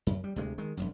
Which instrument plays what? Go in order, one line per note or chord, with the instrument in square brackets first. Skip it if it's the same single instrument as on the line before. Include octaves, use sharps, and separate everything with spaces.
[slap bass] F#2
G3
D2 C3 F#3 G#3
D#3 G#3
E1 B1 F#2